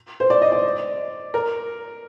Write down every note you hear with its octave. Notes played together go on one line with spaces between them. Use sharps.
C5
D5
D#5
D5
A#4